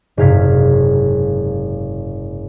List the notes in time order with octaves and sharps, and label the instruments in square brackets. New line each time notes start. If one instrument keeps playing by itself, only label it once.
[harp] F#1 G#2 C3 F5 G#6 B6